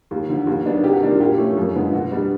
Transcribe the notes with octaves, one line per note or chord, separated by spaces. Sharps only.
D#2
D3 F3
D#2
D#3 F#3 B3 D4
C3 G4
F#4
D#3 G3 A#3 D4 F4
F4
A#2 G4
F3 A3 C#4
F#2
D3 F3 G#3 B3
B2 F#4
G3 B3 D4